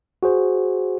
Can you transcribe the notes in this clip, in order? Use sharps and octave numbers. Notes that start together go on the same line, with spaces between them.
F#4 G#4 C5